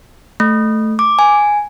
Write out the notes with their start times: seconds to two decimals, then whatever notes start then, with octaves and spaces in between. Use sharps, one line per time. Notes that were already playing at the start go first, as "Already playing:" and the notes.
0.40 A3
0.99 D6
1.19 G#5